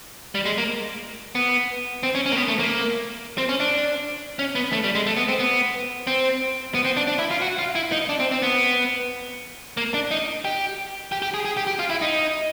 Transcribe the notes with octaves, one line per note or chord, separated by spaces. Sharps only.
G3
G#3
A#3
B3
C4
C#4
C#4
A#3
B3
A3
A#3
C4
C#4
D4
C#4
B3
A3
G3
G#3
A3
B3
C4
B3
C4
B3
C4
D4
D4
E4
F4
F#4
F4
E4
D#4
D4
C4
C4
B3
A#3
D4
D#4
G4
G4
G4
G#4
G#4
G4
G4
F4
E4
D#4